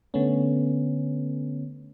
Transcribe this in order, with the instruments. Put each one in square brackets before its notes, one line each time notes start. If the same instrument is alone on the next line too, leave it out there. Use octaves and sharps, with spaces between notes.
[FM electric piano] D3 A3 B3 C#4